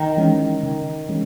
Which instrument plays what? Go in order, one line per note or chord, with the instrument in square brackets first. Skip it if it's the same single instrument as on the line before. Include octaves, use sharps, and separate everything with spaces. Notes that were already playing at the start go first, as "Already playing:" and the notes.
Already playing: [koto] D#3
[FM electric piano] E3 G#3 C#4
C#3
E3 G#3 C#4